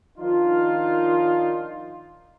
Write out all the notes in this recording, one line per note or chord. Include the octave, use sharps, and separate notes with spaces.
D#3 F3 D4 D#4 F4